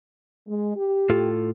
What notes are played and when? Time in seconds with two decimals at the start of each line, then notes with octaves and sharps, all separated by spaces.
0.47 G#3
0.76 G4
1.10 A2 F4 A4